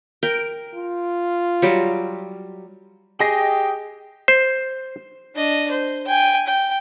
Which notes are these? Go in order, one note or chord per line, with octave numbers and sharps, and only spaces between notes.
A#4 G5
F4
F#3 G3
G4 G#4 D#5 G5 A#6
C5
D4 D#5
C5
G5 G#5
G5